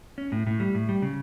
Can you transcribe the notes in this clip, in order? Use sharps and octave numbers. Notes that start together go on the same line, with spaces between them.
C#4
A2
A2
G3
A2
G3
C#3